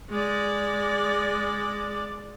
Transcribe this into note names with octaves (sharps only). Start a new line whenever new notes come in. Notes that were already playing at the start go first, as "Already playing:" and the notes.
G#3 D5